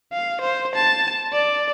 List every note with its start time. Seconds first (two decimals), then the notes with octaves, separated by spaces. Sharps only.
0.12 F5
0.41 C5
0.75 A5
1.33 D5